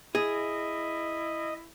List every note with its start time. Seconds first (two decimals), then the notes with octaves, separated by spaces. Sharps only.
0.15 E4 G#4 D#5